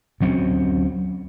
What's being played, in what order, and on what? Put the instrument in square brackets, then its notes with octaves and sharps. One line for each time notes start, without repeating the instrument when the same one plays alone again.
[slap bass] D2 F#3 C4 C#4